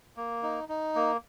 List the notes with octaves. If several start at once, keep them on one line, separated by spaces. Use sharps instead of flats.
A#3
D#4
D#4
A#3